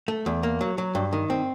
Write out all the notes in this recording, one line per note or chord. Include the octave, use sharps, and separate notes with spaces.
A3
E2
A#3
F#3
F#3
G2
D#3
C4